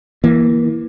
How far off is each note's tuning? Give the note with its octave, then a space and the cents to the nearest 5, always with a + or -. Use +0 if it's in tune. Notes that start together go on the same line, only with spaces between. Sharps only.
E3 +0 A#3 +25